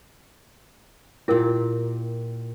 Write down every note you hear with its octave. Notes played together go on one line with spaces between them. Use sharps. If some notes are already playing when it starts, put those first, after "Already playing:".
A#2 E4 G4 A#4